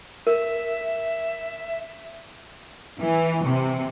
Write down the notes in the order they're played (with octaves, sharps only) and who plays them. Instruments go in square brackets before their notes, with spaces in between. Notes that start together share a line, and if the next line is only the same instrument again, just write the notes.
[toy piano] A#4 [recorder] E5
[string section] E3
C3